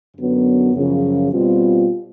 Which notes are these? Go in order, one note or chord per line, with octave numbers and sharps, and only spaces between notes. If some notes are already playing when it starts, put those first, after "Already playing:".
F#2 D3 F#3 B3
F#2 C#3 F3
B2 G3 C4 F4